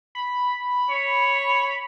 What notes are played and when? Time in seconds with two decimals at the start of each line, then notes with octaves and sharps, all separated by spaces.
0.15 B5
0.90 C#5